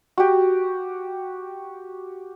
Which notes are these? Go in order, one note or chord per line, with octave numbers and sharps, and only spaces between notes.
F#4 G4